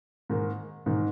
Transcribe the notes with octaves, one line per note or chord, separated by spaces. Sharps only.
G#2 D#3 A#3
G#2 D#3 A#3